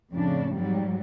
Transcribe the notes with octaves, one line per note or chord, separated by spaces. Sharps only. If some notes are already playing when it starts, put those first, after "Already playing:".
F2 A2 C#3 D4
G#2 F#3 G3